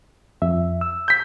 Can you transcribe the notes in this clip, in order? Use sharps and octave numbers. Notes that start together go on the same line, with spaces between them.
F2 E5
E6
G6 B6